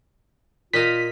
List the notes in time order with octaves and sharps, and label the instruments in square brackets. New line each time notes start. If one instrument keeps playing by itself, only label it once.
[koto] A#2 D#5 F5 [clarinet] F4 [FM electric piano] B6